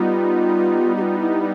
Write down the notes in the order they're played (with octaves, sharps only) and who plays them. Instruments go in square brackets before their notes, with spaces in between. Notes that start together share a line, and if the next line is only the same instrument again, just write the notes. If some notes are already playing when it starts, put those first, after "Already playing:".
Already playing: [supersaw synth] G3 B3 D#4 [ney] F4
[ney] G4
F4
E4